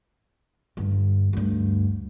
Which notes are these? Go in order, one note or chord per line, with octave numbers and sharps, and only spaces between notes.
G2 D3
D2 G2